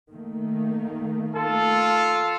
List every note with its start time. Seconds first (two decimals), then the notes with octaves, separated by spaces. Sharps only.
0.11 D#3 A3 A#3
1.36 F4 A4